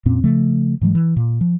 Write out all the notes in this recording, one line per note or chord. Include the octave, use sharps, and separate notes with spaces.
F2 A#2 C4 C#4
C#3 F3 A3
G#2 E3 F#3 G#3
E3
A#2
F3